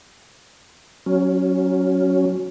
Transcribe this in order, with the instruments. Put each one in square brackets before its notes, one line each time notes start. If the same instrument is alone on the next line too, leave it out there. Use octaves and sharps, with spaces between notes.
[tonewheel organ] F#3 C#4